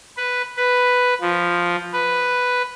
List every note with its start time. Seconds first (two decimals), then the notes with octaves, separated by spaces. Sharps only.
0.17 B4
0.57 B4
1.21 F3
1.93 B4